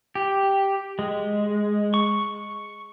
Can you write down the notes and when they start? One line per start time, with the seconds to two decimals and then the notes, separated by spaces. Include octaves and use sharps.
0.15 G4
0.99 G#3
1.94 C#6